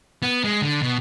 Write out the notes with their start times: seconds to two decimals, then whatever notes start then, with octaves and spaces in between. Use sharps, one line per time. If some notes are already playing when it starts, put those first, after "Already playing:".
0.22 B3
0.44 G#3
0.62 D3
0.82 B2